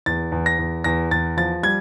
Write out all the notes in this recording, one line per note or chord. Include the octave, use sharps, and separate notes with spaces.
E2 A6
E2
A#6
E2
E2 A#6
E2 A6
F3 A6
G3 G#6